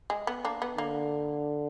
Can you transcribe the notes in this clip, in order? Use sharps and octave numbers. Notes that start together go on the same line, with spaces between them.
G#3
B3
A#3 D4
B3
D3 A#3